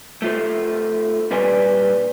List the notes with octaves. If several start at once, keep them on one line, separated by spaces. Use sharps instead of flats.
A3 F4 C5
A#2 G3 B4 D5 G#5 C6